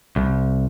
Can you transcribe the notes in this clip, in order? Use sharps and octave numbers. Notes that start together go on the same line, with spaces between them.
C2